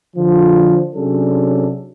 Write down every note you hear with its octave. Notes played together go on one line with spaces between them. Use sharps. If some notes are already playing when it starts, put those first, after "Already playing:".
D3 F3
C3 F#3 C#4 D4 G#4 A4